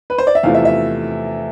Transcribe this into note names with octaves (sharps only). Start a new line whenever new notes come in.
B4
C5
D5
E5
E2 C3 F3 A3 E4 F5
E5
E5